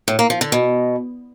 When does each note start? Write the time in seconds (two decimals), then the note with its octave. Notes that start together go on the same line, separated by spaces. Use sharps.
0.08 A2
0.19 A#3
0.30 F3
0.41 D3
0.52 B2